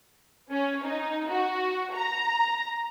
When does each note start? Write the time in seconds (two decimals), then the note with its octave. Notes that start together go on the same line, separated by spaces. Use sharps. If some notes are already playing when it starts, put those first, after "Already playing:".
0.50 C#4
0.84 D#4
1.28 F#4
1.92 A#5